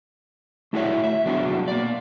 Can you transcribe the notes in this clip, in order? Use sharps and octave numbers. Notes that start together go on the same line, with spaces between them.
A3 E4 F#4 G#4 C#5 E5
E5
F#3 B3 D4 F#4 G#4
A#3 D5